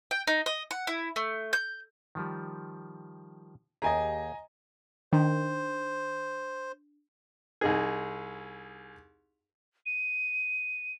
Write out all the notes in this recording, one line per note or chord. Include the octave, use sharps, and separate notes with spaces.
G5
D#4
D#5
F#5
E4
A3
G6
D#3 F3 G3
D#2 G4 G#4 D#5 G#5 A#5
D#3 D4 C5
C2 D#4 G#4
D#7